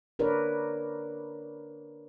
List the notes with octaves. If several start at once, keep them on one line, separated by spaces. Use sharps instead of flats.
D4 A#4 B4 C#5 D5